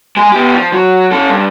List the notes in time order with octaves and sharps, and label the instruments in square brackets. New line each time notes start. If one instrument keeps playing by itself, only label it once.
[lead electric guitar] G#3 G#4
B3 G4
F3
F#3
C#4 A4
G2